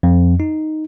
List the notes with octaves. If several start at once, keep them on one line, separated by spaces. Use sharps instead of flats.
F2
D#4